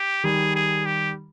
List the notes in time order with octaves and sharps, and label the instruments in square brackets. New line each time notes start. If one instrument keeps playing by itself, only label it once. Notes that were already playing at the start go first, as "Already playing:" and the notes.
Already playing: [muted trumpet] G4
[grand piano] D#3 G3 [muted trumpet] G#4
[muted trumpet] G#4
G4